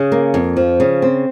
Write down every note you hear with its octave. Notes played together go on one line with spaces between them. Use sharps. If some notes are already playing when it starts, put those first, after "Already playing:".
Already playing: C#3 G#4
A#3
F2
F3
C#3
C4